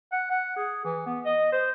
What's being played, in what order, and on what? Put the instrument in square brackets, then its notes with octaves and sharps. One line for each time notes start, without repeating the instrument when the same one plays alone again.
[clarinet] F#5
F#5
G#4
E3
B3
D#5
C5